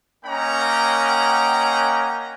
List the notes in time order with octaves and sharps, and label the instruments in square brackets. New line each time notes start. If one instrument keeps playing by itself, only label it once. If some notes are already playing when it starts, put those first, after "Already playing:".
[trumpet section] A#3 C#4 D#5 F#5 G5 A#5